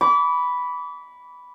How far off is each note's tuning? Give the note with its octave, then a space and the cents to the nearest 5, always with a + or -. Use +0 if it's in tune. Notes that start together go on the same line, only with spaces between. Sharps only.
B5 +0 D6 -40